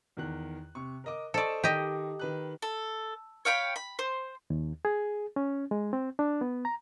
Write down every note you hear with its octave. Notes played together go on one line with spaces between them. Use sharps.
E2 D#3 F#6
C3 C#6
A#4 D#5 D6
A4 C5 D5 D#5 C#6
D#3 G4 D#5
D#3 B4 F#6
A4
C#5 F5 G5 B5
B5
C5
D#2
G#4
C#4
G#3
C4
D4
B3
A#5